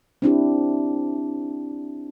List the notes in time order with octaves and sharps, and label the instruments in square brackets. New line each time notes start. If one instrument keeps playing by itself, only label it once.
[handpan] C4 D4 E4 G4